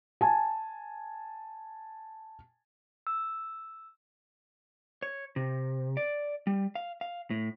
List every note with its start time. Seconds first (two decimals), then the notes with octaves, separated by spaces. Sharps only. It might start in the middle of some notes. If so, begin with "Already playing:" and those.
0.21 G#5 A5
3.07 E6
5.02 C#5
5.36 C3
5.97 D5
6.47 G3
6.75 F5
7.01 F5
7.30 A2